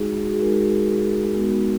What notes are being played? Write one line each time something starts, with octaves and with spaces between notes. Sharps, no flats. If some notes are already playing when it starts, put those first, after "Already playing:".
Already playing: G#3 D#4 F#4 G#4
F#4
G#4
G#3 D#4 F#4 A#4
G#3 B3 D#4 F#4